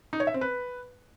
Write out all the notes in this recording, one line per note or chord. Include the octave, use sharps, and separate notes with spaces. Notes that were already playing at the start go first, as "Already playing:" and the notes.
D#4
C#5
E5
C4
B4